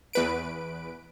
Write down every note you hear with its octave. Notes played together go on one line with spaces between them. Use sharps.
E2 B4 D7